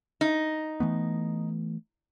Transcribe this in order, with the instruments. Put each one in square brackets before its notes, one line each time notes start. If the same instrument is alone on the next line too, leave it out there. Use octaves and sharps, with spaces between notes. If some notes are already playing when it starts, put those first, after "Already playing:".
[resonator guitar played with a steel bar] D#4
[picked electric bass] E3 A3 B3